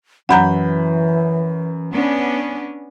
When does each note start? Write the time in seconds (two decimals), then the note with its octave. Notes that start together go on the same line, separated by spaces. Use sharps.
0.29 F#2 E3 F#5 A#5 B5 G6
1.92 B3 C#4 D4